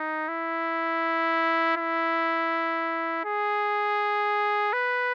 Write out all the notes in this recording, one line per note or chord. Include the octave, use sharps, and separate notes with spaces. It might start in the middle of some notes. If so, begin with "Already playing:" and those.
Already playing: D#4
E4
E4
G#4
B4